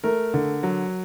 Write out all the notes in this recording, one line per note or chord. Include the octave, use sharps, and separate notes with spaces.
A3 A#4
D3
F#3